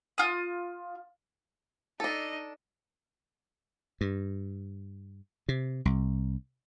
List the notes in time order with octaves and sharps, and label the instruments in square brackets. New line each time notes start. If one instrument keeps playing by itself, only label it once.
[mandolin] F4 D#6
[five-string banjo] D4 A4 [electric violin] D#4 D#5
[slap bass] G2
C3
C2